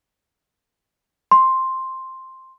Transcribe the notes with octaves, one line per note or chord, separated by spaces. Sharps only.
C6